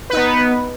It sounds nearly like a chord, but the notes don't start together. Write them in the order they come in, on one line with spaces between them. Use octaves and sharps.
B4 D#4 B3